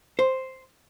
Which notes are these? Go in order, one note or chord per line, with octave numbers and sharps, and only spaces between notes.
C5